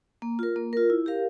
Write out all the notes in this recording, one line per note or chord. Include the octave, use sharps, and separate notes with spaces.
A#3
F4 A#4
A#3
F4 A#4
E4
G4 A#4 F5